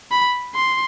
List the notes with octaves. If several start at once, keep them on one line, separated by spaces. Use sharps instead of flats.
B5
C6